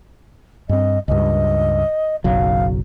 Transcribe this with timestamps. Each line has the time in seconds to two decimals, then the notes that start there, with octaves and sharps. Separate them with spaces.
0.69 G2 C4 D#5
1.08 C#2 G2 D#5
2.24 F#1 B1 F#3 F5